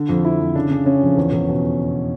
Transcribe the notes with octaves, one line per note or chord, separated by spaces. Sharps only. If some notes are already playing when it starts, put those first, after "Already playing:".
Already playing: D3
F2
F2 E4
F2
C#3 D4
C#3
C#3 C#4
F2
E2
E2
B2